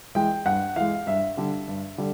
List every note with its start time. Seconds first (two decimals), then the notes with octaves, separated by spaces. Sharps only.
0.15 E3 G#3 G5
0.46 G2 F#5
0.76 E3 G#3 F5
1.07 G2 E5
1.37 D3 G3
1.68 G2
1.98 D3 G3